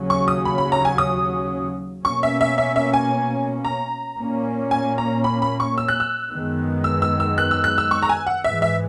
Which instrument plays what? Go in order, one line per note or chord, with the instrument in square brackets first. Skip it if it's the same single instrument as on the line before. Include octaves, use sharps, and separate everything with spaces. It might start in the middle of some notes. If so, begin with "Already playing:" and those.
Already playing: [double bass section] D#2 C#3 F#3 C#4
[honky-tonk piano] C#6
D#6
B5
B5
A#5
G#5
D#6
[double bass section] B2 A#3 C#4 [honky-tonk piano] C#6
[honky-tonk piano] E5
E5
E5
E5
G#5
A#5
[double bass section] A#2 A#3 C#4
[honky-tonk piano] G#5
A#5
B5
B5
C#6
E6
F#6
E6
[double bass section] F#2 D#3 G#3 B3
[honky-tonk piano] E6
E6
E6
F#6
E6
F#6
E6
C#6
A#5
G#5
F#5
[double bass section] G#2 E3 G#3 [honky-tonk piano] E5
[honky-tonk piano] E5